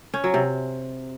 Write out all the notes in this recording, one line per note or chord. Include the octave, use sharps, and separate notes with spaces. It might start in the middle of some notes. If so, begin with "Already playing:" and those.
C#4
F#3
C3